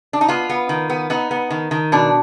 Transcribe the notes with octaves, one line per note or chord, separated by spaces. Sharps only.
D4
D#4
B3 F4
B3
D#3
B3
B3 D#4
B3
D#3
D#3
B2 D4